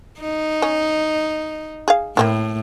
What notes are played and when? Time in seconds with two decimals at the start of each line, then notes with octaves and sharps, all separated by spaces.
0.21 D#4
0.62 C#4
1.88 G#4 F5
2.17 A2 A#3 C4 E4